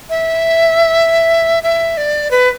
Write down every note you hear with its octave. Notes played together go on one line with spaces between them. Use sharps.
E5
E5
D5
B4